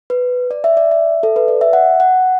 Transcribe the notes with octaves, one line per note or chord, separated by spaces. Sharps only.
B4
D5
E5
D5
E5
A4
B4
D5
E5
F#5
F#5